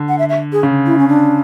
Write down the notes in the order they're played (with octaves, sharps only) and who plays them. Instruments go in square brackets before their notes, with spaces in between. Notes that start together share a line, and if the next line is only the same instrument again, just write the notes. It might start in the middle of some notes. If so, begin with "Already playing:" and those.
Already playing: [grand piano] D3
[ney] F#5
E5
E5
G#4
[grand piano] C#3
[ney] E4
C#4
D4